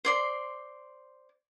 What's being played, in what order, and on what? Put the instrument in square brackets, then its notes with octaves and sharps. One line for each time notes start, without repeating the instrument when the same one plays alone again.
[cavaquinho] C5 D5 C6